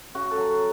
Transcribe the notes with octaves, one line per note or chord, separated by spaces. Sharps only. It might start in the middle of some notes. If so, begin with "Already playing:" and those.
C#3 F#4
A4
F#3